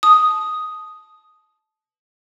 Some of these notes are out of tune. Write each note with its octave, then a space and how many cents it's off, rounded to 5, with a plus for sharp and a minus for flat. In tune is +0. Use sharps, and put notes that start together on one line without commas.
A5 -15 D#6 +0